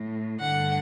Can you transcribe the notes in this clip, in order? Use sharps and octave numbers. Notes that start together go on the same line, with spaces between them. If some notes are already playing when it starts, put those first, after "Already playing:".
Already playing: A2
G2 D3 F#5